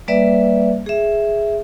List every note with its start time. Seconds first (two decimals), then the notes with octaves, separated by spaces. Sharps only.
0.08 G3 A#3 B4 D5 E5
0.86 G#4 E5